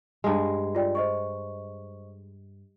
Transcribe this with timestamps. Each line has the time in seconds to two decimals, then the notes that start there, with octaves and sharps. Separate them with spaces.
0.24 G2 G#3
0.75 F4 D5 G5
0.95 C5 D#5 C#6